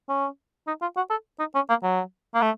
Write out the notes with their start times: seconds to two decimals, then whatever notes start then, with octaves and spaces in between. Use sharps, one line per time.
0.09 C#4
0.67 D#4
0.82 F4
0.97 F#4
1.10 A4
1.39 D#4
1.55 C#4
1.69 A#3
1.83 F#3
2.35 A#3
2.42 A3